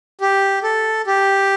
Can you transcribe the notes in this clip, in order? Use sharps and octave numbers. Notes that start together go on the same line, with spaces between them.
G4
A4
G4